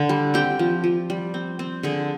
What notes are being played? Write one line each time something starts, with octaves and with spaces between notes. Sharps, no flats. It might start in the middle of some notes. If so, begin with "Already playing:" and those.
Already playing: D3
G3
C4 G4
F3
F3
G3
C4
C4
D3 G#4